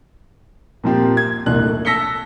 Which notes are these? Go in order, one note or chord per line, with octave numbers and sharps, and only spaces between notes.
A#2 F3 C4 G4
G#6
E1 C2 A#2 D4 F#6
A3
A5 E6 A#6 B6 C#7 G7